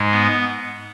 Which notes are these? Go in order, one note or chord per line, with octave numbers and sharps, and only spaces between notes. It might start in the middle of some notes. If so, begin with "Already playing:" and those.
Already playing: G#2 G#3
B3